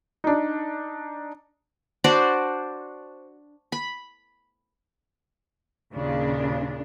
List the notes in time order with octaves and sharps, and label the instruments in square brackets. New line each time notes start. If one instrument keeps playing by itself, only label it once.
[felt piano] D4 D#4
[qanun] D4 F#4 C5 D5
B5
[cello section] D#2 A#2 C#3 D4